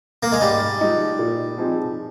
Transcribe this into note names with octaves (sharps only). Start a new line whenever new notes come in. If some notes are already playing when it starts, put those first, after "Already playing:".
A#3
G#3
G#2 G3
F3 G#3 D#4
A#2
F3 C4 D#4 G#4